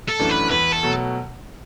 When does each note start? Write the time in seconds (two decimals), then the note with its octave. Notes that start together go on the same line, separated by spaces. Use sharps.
0.08 A4
0.19 F#2 E3 A3 D4
0.30 B4
0.51 E2 B4
0.72 A4
0.83 B2 F#3 A3